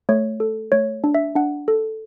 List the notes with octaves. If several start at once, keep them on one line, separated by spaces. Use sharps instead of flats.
A3 C#5
A4
A3 C#5
D4
E5
D4 F#5
A4